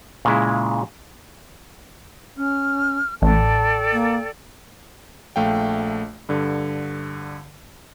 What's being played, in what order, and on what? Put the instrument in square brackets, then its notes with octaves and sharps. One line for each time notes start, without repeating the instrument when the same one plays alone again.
[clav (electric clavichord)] A#2 C#3 G#3 E4
[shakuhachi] C#4 [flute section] F6
[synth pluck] A1 [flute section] A4 D5 G5 [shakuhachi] A5
[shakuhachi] A#3
[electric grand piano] A#1 A3 F5 G5
G2 D3